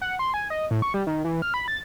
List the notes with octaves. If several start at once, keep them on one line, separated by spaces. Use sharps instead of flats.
F#5
C6
G#5
D#5
A2
C#6
G3
D#3
E3
F6
B5
A6